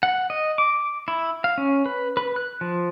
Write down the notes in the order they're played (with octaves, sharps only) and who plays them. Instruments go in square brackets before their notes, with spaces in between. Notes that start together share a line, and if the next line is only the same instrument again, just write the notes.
[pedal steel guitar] F#5
D#5
D6
E4
F5
C#4
B4
B4
F#6
F3